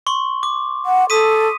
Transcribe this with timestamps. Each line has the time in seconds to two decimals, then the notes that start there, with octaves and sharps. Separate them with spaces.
0.07 C6 C#6
0.43 D6
0.86 F#5
1.10 A4 D#6 B6 D#7